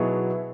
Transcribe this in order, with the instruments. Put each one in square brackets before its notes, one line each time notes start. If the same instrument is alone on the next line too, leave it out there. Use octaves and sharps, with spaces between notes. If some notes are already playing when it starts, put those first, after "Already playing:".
Already playing: [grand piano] B2 F#3 B3 D#4 G#4 [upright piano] E4